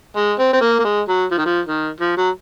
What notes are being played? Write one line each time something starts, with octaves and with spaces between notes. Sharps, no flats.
G#3
C4
C4
A#3
A#3
G#3
F#3
F3
D#3
F3
D#3
F3
F#3